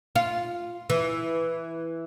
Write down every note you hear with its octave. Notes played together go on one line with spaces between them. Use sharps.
F4
E3